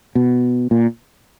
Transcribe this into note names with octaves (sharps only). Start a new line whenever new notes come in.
B2
A#2